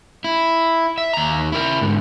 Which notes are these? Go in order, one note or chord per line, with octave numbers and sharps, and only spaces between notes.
E4
E5
D#2 A#5
E4 A#4
G#2 D3